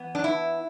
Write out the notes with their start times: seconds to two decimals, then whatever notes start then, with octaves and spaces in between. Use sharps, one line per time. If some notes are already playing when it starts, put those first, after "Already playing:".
Already playing: E3 B3
0.15 D4
0.24 E4